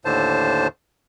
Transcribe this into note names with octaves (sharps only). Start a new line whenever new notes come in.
D#2 A2 D3 C5 A5